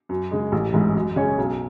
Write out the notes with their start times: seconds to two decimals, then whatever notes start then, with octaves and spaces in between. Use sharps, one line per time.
0.09 F#2
0.31 C#3 G#3
0.52 A1
0.74 G#2 E3
0.95 F#2
1.16 C#3 G#3 C#4
1.38 B1